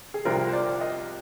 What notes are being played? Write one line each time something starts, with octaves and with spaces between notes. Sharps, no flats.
G#4
C2 C3 F3 C4 F4 A#4
C5
D5
D#5